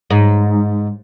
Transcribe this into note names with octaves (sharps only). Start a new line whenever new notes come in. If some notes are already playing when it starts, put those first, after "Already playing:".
G#2